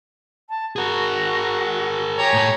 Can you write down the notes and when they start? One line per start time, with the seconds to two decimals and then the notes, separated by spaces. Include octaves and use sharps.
0.49 A5
0.76 F#4 G#4 A#4
2.18 G4 C#5 G#5 A#5
2.34 A2 A4